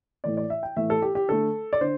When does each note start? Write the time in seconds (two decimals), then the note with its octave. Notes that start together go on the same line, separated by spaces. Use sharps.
0.24 A2 E3 A3 D5
0.37 D5
0.50 E5
0.63 G5
0.77 A2 E3 A3 E5
0.90 A4
1.02 G4
1.15 G4
1.28 D3 A3 A4
1.73 D5
1.81 D3 C5